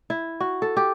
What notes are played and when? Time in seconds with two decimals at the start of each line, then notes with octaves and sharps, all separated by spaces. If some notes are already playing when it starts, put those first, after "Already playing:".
0.10 E4
0.40 F#4
0.62 A4
0.77 G4